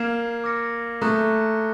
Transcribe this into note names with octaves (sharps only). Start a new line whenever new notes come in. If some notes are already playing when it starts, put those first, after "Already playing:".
Already playing: A#3 F6 G#6 C7 E7
D6 F6 A#6 C#7
A3 A#5 D#6 F#6